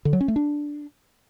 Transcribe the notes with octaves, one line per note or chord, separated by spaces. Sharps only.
D3
F#3
C#4
A3
D4